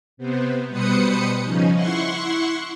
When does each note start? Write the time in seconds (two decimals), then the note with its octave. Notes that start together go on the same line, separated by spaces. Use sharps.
0.17 C3 B3 C4
0.68 B2 G3 B4 C5 D#6 C#7
1.43 C#3 F3 C#4 D#4
1.73 E4 F#5 C6 C#6